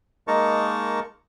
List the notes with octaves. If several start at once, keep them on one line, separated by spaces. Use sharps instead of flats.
G#3 A#3 D#4 A#4 A5 C#6